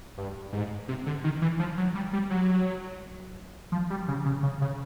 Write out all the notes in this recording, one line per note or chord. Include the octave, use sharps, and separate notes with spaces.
G2
G#2
C3
D3
D#3
E3
F3
F#3
G3
G3
F#3
F3
G3
C#3
C#3
C#3
C#3